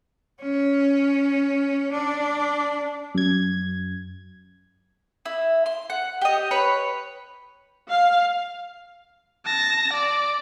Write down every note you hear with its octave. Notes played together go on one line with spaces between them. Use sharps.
C#4
D4
F#2 G#6
E4
C6
F#5
G4 D#5
B4 C#5 B5
F5
A5 A#6
D5